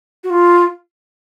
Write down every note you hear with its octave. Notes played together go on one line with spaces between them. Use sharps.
F#4
F4